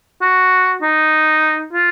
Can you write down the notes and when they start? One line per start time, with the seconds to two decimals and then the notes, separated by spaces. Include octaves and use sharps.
0.21 F#4
0.82 D#4
1.73 F4